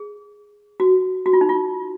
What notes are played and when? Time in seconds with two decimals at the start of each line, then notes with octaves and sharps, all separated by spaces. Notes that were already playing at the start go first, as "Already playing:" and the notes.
Already playing: G#4
0.80 F#4
1.26 F#4
1.33 F4
1.41 D#4
1.49 F4